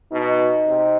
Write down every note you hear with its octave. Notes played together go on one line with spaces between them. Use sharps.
B2 D#4
C3